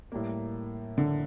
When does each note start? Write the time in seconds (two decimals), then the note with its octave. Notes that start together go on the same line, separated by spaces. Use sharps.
0.12 A2 G3 A#3
0.98 D3